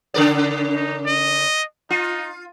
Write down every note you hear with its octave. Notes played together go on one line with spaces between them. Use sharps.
C#3 A#4 D5
D#4
D#5
D#4 F4